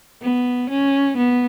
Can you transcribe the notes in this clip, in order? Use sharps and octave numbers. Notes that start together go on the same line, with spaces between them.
B3
C#4
B3